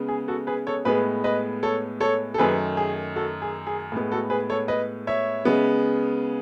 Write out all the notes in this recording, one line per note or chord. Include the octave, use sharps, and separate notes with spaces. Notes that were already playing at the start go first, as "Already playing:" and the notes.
Already playing: C#3 G#3 B3
G#4
F#4 A4
G#4 B4
A4 C#5
A2 G#3 B3 G#4 B4
B4 D#5
A4 C#5
A4 C#5
A4
F#2 D#3 A3 G#4 B4
G#4
F#4 A4
G#4
G#4
A2 G#3 B3
F#4 A4
G#4 B4
A4 C#5
B4 D#5
C#5 E5
C#3 G#3 B3